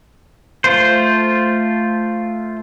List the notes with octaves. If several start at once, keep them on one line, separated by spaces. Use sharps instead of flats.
A3 F4 C5